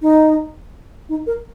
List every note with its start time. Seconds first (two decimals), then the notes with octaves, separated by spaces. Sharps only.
0.02 D#4
1.09 D#4
1.27 A#4